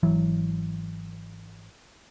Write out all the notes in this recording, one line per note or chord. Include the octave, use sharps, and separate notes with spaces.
G#1 E3 F#3